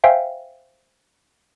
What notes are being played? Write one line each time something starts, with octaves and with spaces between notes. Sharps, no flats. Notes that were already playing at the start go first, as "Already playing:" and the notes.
C5 E5 F5 G5 G#5